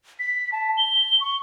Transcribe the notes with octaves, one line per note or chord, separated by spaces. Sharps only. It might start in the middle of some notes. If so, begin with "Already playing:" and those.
B6
A5
G7
C#6